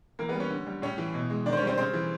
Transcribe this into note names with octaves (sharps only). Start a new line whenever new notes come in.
E3 A#3 A#4
B3 B4
G3
C#4 C#5
D3
G3
A2 C#4 C#5
E3
B2
G#3
D#3 D4 D5
C5
C#4 C#5
G3
C4 C5
C#3 C4 C5
E3